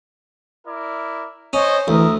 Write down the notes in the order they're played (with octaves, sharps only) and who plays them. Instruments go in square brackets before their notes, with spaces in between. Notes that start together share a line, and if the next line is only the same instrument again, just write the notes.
[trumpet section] E4 A#4 D5
[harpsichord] C#4 [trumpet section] C5 C#5 D#5
[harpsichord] D2 [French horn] E3 [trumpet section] A#4 E5 D#6